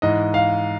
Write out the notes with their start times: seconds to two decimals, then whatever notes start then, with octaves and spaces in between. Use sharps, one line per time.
0.02 G#2 E3 D#5
0.34 F5